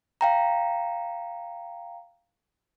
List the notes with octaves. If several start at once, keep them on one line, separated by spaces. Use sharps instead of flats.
F5 G5 A#5